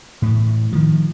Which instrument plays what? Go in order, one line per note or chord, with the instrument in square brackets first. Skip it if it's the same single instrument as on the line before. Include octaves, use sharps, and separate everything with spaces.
[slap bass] A2 E3
D#3 F3